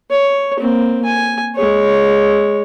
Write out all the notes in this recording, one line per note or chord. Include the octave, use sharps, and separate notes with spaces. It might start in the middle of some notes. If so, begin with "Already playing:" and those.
C#5
A#3 C4
G#5
G#3 C#5